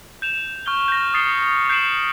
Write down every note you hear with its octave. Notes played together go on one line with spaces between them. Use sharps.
G6 E7 F7
C#6 F6 G6 G7
G6 A#6
D#6 A6 C7 C#7 G7
G6 C7 D7 E7 F#7